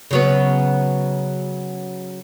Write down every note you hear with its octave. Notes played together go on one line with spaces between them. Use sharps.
C#3 F#3 B3